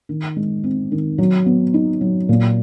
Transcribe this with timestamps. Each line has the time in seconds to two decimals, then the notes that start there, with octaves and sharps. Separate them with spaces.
0.09 D#3
0.36 G#3
0.64 C4
0.92 D#3
1.18 F#3
1.46 B3
1.74 D#4
2.01 F#3
2.29 A#2